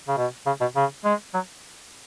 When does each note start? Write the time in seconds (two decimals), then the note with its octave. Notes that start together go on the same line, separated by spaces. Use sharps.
0.08 C#3
0.17 B2
0.47 C#3
0.61 B2
0.76 C#3
1.05 G#3
1.34 F#3